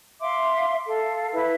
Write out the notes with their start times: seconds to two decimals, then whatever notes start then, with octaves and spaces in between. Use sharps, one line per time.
0.21 E5 F5 C6 D6
0.87 A4 F5
1.33 E4 B4 E5